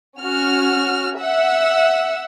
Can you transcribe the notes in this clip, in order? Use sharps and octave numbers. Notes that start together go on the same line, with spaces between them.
C#4 F#4 F6
E5 F#5 E6